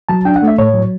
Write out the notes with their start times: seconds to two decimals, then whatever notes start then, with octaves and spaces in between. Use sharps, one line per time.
0.09 F#3 A5
0.25 D4 G5
0.36 F#5
0.42 A3
0.47 E5
0.58 A2 C#5
0.74 F#3